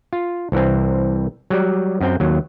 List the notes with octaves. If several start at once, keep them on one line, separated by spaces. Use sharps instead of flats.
F4
C2 E3 C4
F#3 G3 D5
F#2 C4 G5
D#2 F#3